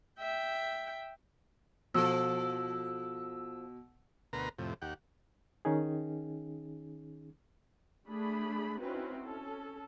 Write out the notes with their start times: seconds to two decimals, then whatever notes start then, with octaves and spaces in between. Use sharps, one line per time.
0.19 E5 G5
1.94 B2 F3 A4 E6
4.33 D2 B2 A#4 B4 A#5 C6
4.58 F2 A2 C3
4.82 D#2 G4 F#5
5.65 D#3 C#4 D#4 G#4
8.07 A3 D4 G#4 B5
8.80 C4 C#4 D#4 E4 F#4 B4
9.23 C#4 A4